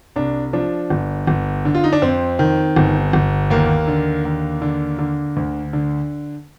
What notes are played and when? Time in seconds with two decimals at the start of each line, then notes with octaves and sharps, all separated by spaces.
0.16 C2 D4
0.53 F3 D4
0.90 G1
1.27 G1
1.65 D3
1.75 F4
1.84 D#4
1.93 D4
2.02 F2 C4
2.39 D#3
2.76 G1
3.13 G1
3.50 D#2 A#3
3.88 D3
4.25 D#2
4.62 D3
4.99 D3
5.37 D2
5.73 D3